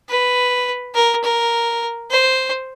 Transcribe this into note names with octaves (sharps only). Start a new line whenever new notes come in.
B4
A#4
A#4
C5